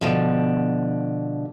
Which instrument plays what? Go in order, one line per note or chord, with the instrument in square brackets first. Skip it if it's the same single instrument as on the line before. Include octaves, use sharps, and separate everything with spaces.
[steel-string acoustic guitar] B2 D3 F3